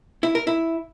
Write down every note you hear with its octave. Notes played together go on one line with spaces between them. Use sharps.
E4
A#4
E4